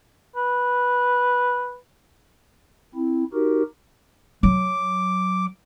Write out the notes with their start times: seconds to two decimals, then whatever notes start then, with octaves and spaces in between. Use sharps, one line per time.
0.36 B4
2.95 C4 E4
3.33 D#4 F#4 G4 A#4
4.43 F#3 D6